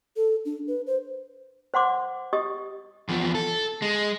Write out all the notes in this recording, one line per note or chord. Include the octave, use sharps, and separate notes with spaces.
A4
D4
B4
C5
C5 F#5 C6 D6
G4 D#5 D#6
E2 F3
A4
G#3